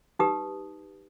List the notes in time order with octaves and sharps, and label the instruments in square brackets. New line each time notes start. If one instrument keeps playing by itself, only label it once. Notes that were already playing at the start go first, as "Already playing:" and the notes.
[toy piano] D#4 G4 B4 D#6